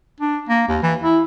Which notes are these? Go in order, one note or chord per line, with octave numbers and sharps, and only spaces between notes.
D4
A#3
D#2
E3
E4